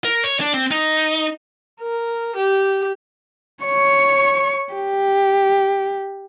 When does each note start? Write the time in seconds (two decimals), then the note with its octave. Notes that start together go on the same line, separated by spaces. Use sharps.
0.05 A#4
0.23 C#5
0.40 D4
0.54 C4
0.71 D#4
1.81 A#4
2.36 G4
3.65 C#5 C#6
4.75 G4